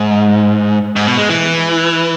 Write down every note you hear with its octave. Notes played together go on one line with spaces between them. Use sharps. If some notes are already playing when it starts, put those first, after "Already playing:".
Already playing: G#2
G#2
B2
G#3
E3